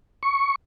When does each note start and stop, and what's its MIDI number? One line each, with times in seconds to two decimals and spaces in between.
0.23 0.55 85